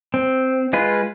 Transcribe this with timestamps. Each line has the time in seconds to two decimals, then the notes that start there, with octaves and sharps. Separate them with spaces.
0.14 C4
0.73 G#3 F4 B4